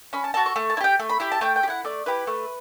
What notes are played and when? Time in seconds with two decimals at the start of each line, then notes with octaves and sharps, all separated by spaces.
0.13 C#4 B5
0.24 A5
0.34 F#4 A4 A5
0.46 C#6
0.56 A3
0.70 A5
0.77 E4
0.81 G4 G5
0.99 A3
1.09 B5
1.20 E4 G4 B5
1.32 A5
1.41 A3 G5
1.56 G5
1.63 G4
1.68 E4 F#5
1.85 A3 D5
2.06 E4 G4 B4
2.27 A3